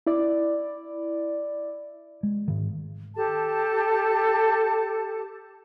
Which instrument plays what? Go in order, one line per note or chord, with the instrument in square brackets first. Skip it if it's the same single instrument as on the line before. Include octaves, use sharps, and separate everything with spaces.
[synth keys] E4 D5
[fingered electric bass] G#3
G#2 D#3
[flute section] G4 A4 A5